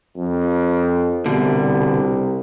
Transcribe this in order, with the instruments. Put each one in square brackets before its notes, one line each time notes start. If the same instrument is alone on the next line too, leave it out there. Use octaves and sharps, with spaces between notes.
[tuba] F2
[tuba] C2 [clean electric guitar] B2 D3